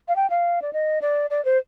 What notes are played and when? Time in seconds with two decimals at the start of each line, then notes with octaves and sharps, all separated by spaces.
0.08 F5
0.16 G5
0.30 F5
0.62 D5
0.73 D#5
1.02 D5
1.30 D5
1.45 C5